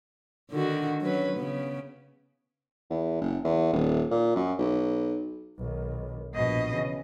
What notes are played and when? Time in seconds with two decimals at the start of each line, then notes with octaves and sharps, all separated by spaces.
0.51 D3 D#3 F#4
1.01 F#3 C#4 B4
1.37 C#3 B3
2.90 E2
3.21 F#1
3.45 E2
3.73 D#1
4.11 A#2
4.36 F#2
4.59 B1
5.58 B1 D#3
6.34 A#1 G#2 B2 D#5
6.69 C#3 E3